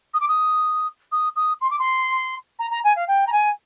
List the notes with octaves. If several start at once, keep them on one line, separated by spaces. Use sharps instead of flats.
D#6
D6
D#6
D#6
D#6
C6
D6
C6
A#5
A#5
G#5
F5
G5
A#5
G#5